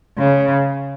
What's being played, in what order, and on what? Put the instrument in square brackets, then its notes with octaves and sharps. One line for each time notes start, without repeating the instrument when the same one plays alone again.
[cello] C#3